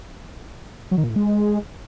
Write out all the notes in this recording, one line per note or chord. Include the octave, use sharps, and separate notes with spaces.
F#3
D#3
A#2
A2
G#3